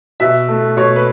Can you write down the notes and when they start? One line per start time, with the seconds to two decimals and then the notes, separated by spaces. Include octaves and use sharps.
0.20 B2 E5
0.48 A3
0.77 B2 C#5
0.96 B4